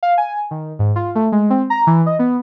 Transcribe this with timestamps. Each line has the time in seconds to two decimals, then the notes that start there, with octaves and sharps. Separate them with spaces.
0.03 F5
0.18 G#5
0.51 D#3
0.79 G#2
0.96 F4
1.15 A3
1.32 G#3
1.50 C4
1.70 A#5
1.87 E3
2.06 D#5
2.19 B3